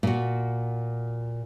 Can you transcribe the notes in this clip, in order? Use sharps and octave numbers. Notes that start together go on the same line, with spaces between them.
A#2 F#4